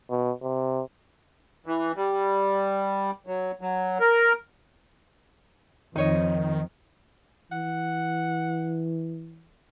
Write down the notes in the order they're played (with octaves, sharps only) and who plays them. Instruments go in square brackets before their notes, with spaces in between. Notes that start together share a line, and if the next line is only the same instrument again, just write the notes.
[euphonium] B2
C3
[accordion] E3
G3
F#3
F#3
A#4
[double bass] F2 [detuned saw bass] D#3 [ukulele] D#4 C#5 D#5
[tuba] E3 [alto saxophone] F#5